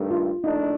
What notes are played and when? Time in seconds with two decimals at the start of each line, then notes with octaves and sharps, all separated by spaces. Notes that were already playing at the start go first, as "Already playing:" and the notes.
Already playing: G2 D#3 A3
0.11 F4
0.44 A#1 A2 A3 D4 D#4